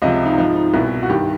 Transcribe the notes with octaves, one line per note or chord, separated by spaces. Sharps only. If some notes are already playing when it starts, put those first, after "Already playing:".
C#2 C3 F3 D#5
D#4
G#2 F3 D#4
D#4
C2 B2 E4
F#4
G2 D#3 G4